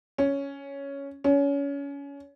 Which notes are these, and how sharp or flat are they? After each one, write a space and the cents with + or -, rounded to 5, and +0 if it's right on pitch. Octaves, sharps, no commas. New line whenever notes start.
C#4 +5
C#4 +25